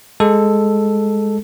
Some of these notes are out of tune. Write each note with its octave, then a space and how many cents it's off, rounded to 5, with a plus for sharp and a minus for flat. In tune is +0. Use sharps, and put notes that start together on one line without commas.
G#3 +0 A4 +0